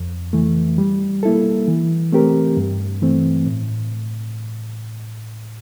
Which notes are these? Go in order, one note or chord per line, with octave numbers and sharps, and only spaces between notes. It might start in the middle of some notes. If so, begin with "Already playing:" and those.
Already playing: F2
E3 A3
G3
A#3 E4 A4
E3
A3 C4 G4 A#4
G2
E3 A3 C4
A2